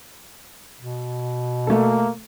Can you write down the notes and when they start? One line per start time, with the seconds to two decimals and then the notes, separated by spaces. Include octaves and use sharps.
0.80 B2
1.67 A3 A#3 A4